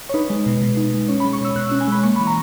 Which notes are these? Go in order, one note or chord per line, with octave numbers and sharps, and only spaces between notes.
C#5
D#4 B4
G#3
B2
B2
D#4
G#3
C#4 C#5
G#3 B5
C#6
B2 E6
B2 F#6
C#4 E6
G#5
G#3 B5
A#3 C#6
E3 B5
A#5